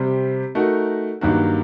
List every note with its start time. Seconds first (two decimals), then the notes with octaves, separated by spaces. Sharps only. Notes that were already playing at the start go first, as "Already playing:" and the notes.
Already playing: C3 G3 C4 G4 C5
0.55 A3 D#4 F#4 A#4
1.21 G2 D#3 F#3 A#3 F#4